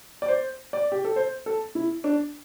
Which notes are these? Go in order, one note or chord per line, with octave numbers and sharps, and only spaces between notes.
D5
C5
D5
G4
A4
C5
A4
E4
D4